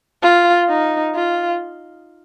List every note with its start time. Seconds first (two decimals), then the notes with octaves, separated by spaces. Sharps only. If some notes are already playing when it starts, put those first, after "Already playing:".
0.23 F4
0.69 D#4
1.15 F4